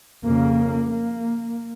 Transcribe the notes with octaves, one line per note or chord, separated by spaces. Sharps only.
F2 C#3 A#3
A#3